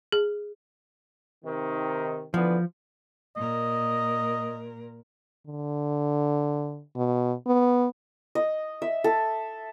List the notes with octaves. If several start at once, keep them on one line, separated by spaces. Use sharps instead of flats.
G#4
C3 D#3
D3 E3 F3 B3
A#2 A#4 D#5
D3
B2
B3
D#5
E5
A4